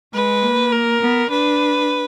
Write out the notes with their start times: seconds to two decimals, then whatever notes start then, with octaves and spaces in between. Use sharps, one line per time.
0.14 G#3 B4
0.42 A#3
0.72 A#4
1.01 B3
1.30 D4 B4